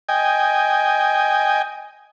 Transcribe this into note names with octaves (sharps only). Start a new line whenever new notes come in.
D#5 G5 G#5